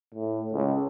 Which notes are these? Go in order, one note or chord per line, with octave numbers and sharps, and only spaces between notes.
A2
C#2